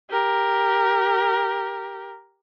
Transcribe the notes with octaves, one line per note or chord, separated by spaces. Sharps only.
G4 A#4